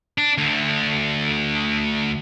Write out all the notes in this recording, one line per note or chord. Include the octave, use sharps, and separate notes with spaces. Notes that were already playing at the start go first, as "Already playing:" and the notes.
D4
D2 D3